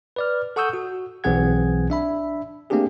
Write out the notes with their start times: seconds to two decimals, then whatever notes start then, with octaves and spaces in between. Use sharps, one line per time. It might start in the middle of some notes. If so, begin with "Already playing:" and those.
0.16 B4 D5 F6
0.56 A4 F#5 C#6 D#6 E6 G6
0.73 F#4
1.24 B1 E3 C4 G#4 F#5 G#6
1.90 D4 E5 B5
2.70 A3 A#3 C4 D4 G4 G#4